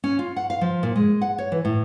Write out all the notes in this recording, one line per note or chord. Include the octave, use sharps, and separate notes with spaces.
C#4
F4
F#5
F5
F3
A#2
G#3
F#5
C#5
E3
A2